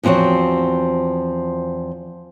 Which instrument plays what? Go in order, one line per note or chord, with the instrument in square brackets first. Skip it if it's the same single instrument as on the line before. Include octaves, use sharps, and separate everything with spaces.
[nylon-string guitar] E2 F3 C4 F#4 C#5